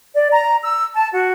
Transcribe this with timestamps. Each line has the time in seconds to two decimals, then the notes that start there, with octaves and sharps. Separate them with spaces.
0.14 D5
0.31 A#5
0.62 E6
0.94 A5
1.12 F#4